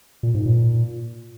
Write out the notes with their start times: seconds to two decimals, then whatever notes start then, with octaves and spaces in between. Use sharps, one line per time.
0.23 A#2
0.34 G#2
0.46 A#2